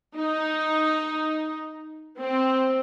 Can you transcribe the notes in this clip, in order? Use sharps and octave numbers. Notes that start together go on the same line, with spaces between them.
D#4
C4